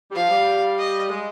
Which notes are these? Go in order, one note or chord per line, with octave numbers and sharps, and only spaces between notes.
G3
F3 F5
G3
D#5
G#3